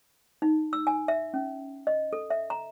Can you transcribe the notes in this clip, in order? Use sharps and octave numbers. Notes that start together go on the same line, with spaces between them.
D#4
E6
G#5
E5
C#4
D#5
A4
E5
A#5